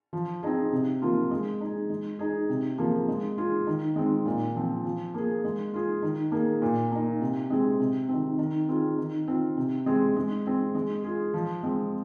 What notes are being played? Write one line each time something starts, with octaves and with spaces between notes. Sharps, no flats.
F3
C4 D#4 G#4
C3
F3 A#3 F4
G#3
D#4 G#4
G#3
D#4 G#4
C3
F3 A#3 G#4
G#3
F4 G#4
D#3
G#3 C4
A#2
F3 C4
F3
A#3 G#4
G#3
F4 G#4
D#3
A#3 G#4
A#2
A#3 D#4
C3
G#3 C4 G#4
C3
D#3 C4
D#3
C4 F4 G#4
D#3
C4 F4
C3
G#3 C4 G#4
G#3
C4 G#4
G#3
F4 G#4
F3
G#3 C4